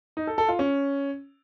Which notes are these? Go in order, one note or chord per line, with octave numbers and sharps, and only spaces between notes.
D#4
A4
A4
F4
C#4